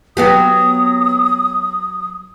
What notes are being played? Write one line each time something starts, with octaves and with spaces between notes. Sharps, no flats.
F#3 B3 G4 D#6